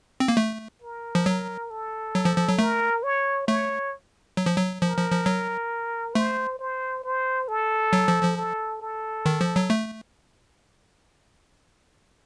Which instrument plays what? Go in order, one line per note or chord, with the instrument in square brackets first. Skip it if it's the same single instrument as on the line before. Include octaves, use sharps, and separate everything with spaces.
[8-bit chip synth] C4
A#3
A3
[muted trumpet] A#4
[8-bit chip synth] F3
F#3
[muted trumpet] A4
[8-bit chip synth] F#3
F3
F3
F#3
[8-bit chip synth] A3 [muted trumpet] A#4
[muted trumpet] C#5
[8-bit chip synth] A3 [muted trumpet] C#5
[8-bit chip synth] F#3
F3
F#3
[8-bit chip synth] F3 [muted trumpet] A#4
[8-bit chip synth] F3
F3
F#3
[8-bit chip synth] A3 [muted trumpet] C5
[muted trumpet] C5
C5
A4
[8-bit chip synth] F#3
F3
F3
[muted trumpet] A4
A4
[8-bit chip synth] D#3
F3
F#3
A3